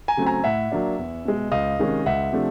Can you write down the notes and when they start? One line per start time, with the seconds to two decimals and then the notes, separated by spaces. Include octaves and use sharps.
0.08 G#5 A#5
0.17 C#3 F#3 A3 C4
0.26 G#5 A#5
0.44 A2 E5 F#5
0.72 F#3 A#3 D4
0.99 E2
1.25 B2 G#3
1.52 C#2 D#5 F5
1.79 C3 D#3 G#3 C#4
2.06 C#2 E5 F#5
2.33 C3 F3 A3 D4